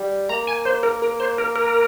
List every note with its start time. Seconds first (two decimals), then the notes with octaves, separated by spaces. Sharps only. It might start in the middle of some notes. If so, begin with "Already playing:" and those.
Already playing: G3
0.29 A#3 A#5
0.47 G#5
0.65 C5
0.83 A#4
1.02 A#4
1.20 C5
1.38 A#4
1.56 A#4